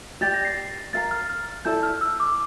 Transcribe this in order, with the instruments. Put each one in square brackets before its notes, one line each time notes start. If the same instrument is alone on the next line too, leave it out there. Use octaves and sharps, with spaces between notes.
[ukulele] G4 D5 G5 [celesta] A6
[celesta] A#6
C7
C7
[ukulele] A#4 F5 A#5 [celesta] A6
[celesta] F6
F6
[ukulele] E4 A4 D5 A5 [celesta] G6
[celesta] F6
E6
D6